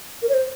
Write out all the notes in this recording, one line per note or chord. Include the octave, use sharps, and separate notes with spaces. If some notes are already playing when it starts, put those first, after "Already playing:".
A#4
C#5
C5